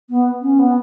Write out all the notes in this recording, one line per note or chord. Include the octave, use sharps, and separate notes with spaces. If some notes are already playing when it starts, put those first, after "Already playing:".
B3
C#4
B3